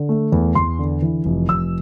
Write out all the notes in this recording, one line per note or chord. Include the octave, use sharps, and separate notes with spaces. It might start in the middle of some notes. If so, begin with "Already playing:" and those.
Already playing: D3
A3
E2
E2 C6
D3
E3
F1
F1 E6